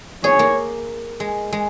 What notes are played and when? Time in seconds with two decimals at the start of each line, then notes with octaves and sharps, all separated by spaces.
0.24 G#4 C#5
0.39 A#3
1.20 G#3
1.53 G#3